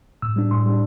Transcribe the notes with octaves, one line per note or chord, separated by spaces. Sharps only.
A2 E6
G3 D4
A2 C6
G3 D4